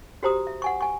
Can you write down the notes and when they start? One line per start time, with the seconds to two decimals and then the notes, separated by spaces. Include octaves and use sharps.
0.23 F#4 G4 C5 A#5 D#6
0.47 E5
0.62 F#5 G#5 C#6
0.81 G#5 C#6